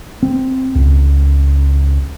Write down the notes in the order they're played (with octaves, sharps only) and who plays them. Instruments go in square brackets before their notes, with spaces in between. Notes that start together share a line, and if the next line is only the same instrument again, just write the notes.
[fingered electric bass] C4
C#2